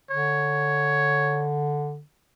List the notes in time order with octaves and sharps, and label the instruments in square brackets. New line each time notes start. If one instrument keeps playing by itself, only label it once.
[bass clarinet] D3 [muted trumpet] C#5